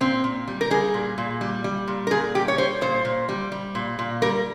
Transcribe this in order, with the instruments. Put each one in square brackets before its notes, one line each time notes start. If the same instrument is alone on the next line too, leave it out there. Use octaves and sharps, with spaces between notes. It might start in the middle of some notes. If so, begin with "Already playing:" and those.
[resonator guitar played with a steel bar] A#2 C4
A#2
G3
A#4
G3 G#4
A#2
A#2
G3
G3
A#2
A#4
A#2 G#4
G3 G4
C#5
G3 C5
A#2 C5
A#2
G3
G3
A#2
A#2
G3 A#4